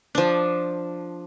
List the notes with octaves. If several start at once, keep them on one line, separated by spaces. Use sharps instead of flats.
F3 D4